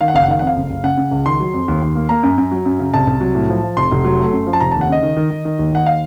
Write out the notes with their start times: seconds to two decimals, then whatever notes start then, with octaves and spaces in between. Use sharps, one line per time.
0.01 D#3 F5
0.08 F#5
0.14 F#1 F5
0.23 F#5
0.28 D#3 F5
0.39 F2 F#5
0.47 F5
0.56 F#1
0.70 F#1
0.84 C#3 F#5
0.97 C#3
1.11 C#2
1.26 D#3 C6
1.40 F#3
1.54 F2
1.68 D#2
1.82 D#2
1.95 A#3
2.09 A#3 A#5
2.23 F#2
2.38 F#2
2.51 F#3
2.65 F#2
2.79 C#3
2.94 C2 A5
3.07 C2
3.21 F#3
3.35 A2
3.49 F3
3.63 F3
3.77 F1 C6
3.91 F1
4.04 F#3
4.19 A3
4.33 F#2
4.46 F3
4.53 A5
4.60 F1 A#5
4.72 D#2 A5
4.81 F#5
4.89 C#3 D#5
5.02 D#3
5.17 D#3
5.30 D#3
5.45 D#3
5.59 D#2
5.72 D#2 F#5
5.86 F5